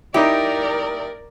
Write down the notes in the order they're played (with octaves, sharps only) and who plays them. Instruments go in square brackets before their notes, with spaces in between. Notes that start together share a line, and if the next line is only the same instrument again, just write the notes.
[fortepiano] D#4 E4 [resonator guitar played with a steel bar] G4 [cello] A#4 D5